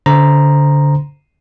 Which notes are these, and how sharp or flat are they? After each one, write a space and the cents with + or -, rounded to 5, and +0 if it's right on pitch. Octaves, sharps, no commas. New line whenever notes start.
D3 -25 C5 -15 A#5 +0